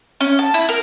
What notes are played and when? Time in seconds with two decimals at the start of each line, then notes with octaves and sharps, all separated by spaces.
0.21 C#4
0.39 A5
0.54 E4
0.69 A#4